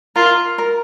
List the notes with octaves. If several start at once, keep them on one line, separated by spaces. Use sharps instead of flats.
F4 A#4
A#4